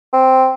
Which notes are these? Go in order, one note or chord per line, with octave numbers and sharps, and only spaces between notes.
C4